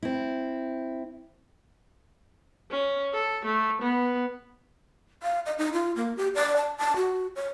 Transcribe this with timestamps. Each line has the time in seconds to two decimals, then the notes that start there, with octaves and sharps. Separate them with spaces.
0.03 C4 E4
2.72 C#4
3.14 A4
3.45 A3
3.82 B3
5.23 F5
5.46 D#5
5.58 D#4
5.73 F4
5.96 A#3
6.17 G4
6.35 D5
6.56 A5
6.78 A5
6.96 F#4
7.36 C#5